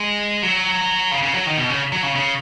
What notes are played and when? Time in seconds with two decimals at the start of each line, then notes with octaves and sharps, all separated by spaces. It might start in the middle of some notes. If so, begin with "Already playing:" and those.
Already playing: G#3
0.43 F#3
1.12 C#3
1.23 C#3
1.34 F#3
1.47 D#3
1.57 B2
1.69 C#3
1.92 F#3
2.03 C#3
2.15 C#3